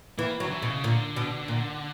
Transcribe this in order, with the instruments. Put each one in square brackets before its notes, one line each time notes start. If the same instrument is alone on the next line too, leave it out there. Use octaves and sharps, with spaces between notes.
[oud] E3 [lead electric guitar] A#3
[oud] F#3
[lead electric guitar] D3
E3
[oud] B2
[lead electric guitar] C#3
[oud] A#2 [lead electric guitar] D3
[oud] B2
A#2